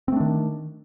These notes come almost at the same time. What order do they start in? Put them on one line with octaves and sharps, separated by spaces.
C4 A3 D4 D#3